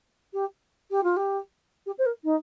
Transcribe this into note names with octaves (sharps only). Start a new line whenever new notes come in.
G4
G4
F4
G4
G4
C5
A#4
D#4